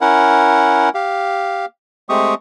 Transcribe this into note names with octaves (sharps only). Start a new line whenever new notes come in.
C#4 E4 A#4 F#5
G4 F5
G#3 A3 C4 G4 C#6 D#6